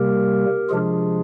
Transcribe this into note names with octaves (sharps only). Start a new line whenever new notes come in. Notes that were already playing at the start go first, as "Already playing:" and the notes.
Already playing: C3 G3 A#3 G4 A#4
C3 F3 G#3 D4 F4 G#4